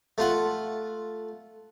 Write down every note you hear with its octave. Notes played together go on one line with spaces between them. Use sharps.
A3 F4 F#5